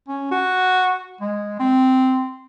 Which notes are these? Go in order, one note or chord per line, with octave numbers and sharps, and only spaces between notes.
C#4
F#4
G#3
C4